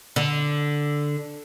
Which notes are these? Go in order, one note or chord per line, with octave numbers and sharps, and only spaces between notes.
D3